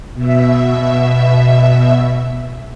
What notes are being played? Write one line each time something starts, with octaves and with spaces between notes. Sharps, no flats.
B2 E5